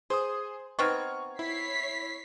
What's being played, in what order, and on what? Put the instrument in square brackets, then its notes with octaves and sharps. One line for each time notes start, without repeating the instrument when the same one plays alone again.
[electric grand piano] G#4 C6 D#6 [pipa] C5
[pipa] B3 C4 D#4 [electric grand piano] C#6 F6 G#6
[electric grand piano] E4 [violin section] C#5 B6 C7